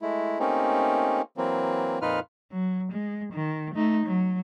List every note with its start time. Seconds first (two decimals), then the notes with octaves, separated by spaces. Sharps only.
0.02 G#3 A3 E4
0.39 A3 A#3 C4 C#4 D#4 G4
1.37 E3 F#3 A#3 C4
2.02 F2 A#2 D#4 F4 B4 F6
2.52 F#3
2.92 G#3
3.33 D#3
3.75 A3 D#4
4.05 F#3